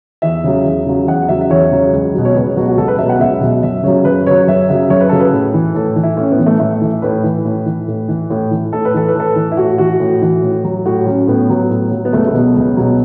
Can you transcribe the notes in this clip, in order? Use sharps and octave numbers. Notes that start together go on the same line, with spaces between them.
E2 E5
C#3 F#3
E2
C#3 F#3
E2 F#5
C#3 F#3 E5
E5
E2 C#5
C#3 F#3
C#2
B2 F#3
C#5
C#2 B4
B2 F#3 F#4
F#4
C#2 A4
B4
B2 F#3 E5
F#5
C#2 E5
B2 F#3
F#2 E5
C#3 F#3 C#5
F#2 B4
C#3 F#3 C#5
F#2 E5
C#3 F#3 E5
F#2 C#5
B4
C#3 F#3 A4
B4
A2
E3
A2 A4
E3
E4
A2 C#4
B3
E3
A3
A2 A3
E3
A2 B4
E3
A2
E3
A2
E3
A2
E3
A2 A4
B4
E3 A4
B4
A2 A4
E3
E4
A2 F#4
E3 F#4
A2
E3
A2
F#3
A2 F#4
F#3 C#4
A2 B3
F#3
A2
F#3
B3
C#2 A3
A3
B2 F#3 B3
C#2
B2 F#3